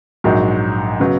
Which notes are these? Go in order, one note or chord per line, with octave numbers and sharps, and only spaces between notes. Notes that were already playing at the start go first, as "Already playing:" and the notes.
A#1 G#2 F#3
C#3 F#3 B3